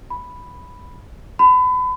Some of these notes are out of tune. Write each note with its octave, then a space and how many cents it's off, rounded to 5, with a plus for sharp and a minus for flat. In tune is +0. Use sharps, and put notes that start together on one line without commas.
B5 +0
B5 +30